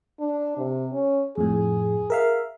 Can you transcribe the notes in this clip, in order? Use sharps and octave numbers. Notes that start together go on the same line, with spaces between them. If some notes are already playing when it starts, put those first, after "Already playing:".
D4
C3
C#4
F2 A2 G#4
A#4 E5 F5